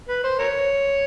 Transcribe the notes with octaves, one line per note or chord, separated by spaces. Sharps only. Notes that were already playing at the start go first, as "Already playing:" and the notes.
B4
C5
A#4 C#5